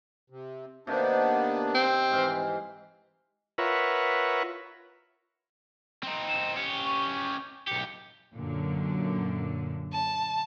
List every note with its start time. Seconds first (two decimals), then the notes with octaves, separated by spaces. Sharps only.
0.30 C3
0.87 C3 D#3 A#3 B3 D4
1.75 C4
2.11 G#2 E3 F5
3.58 F4 A#4 B4 C#5 E5 F#5
6.03 C4 D#4
6.28 E7
6.56 C#4 G4 C#7
6.85 C#6
7.67 B1 G4 C#7
8.36 F#2 A#2 D3
9.93 A5